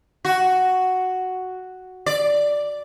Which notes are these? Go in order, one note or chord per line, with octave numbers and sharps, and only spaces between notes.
F#4
D5